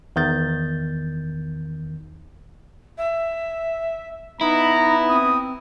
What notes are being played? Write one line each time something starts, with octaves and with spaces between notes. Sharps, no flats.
E2 D#3 G6 A6
E5
B3 D#4 E4 A#5
C4 D#6